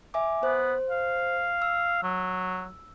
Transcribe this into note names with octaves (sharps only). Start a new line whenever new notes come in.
E5 G#5 D6
B3 C5
F5
E6
F#3